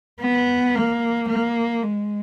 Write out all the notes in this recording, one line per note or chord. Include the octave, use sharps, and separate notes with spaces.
B3
A#3
A#3
G#3